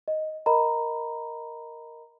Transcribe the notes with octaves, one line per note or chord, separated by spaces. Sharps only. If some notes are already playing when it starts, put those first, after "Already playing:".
D#5
A#4 D#5 A#5 B5